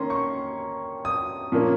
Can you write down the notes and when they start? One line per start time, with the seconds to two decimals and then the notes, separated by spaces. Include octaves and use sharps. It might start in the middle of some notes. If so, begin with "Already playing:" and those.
Already playing: D#3 A#3 C#4 A#5 C6
0.10 C#6
1.05 D#6
1.52 A#2 F3 A#3 C#4